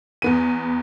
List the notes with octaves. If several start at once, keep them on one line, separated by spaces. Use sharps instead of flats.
E2 B3 D#7